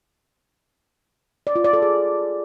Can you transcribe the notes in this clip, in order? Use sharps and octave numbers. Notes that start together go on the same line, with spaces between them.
D5
F4
D5
A4
G#4